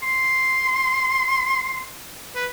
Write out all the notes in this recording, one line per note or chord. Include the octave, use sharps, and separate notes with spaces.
C6
B4